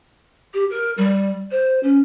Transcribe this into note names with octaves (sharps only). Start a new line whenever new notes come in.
G4
A#4
G3
C5
C#4